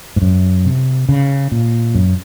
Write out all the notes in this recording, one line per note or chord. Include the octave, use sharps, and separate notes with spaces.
G#2
F#2
C3
C#3
A#2
F#2